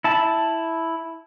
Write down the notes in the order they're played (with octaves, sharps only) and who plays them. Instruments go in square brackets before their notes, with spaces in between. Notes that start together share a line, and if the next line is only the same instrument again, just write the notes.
[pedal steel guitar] E4 A5